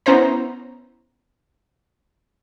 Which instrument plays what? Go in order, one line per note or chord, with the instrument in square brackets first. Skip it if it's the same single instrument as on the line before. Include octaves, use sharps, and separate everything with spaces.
[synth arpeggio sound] B3 C#4 E4 C5 A#5